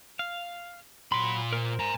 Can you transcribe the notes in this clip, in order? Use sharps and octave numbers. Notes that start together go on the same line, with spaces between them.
F5
A#2 F#3 B5 C6
A#4 C5
G#5 A#5